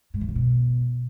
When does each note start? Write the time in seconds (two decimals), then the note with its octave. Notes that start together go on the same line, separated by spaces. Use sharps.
0.14 G#2
0.21 E3
0.28 C#3
0.36 B2